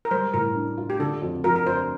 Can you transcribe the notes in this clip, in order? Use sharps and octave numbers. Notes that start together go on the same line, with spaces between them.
A#4
G3 C5
A2 A#4
D4
F4
G4
D3 A4
F2
F3 A#4
A#4
F2 C5